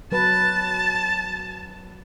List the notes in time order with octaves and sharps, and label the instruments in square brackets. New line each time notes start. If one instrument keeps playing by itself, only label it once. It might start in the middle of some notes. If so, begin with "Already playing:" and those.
[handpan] F#3 B4 [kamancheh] A5